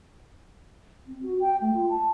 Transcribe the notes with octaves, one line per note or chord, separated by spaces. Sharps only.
C4
F#4
G5
A3
F4
A5